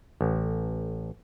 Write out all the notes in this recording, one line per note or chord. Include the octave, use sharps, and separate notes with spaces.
A1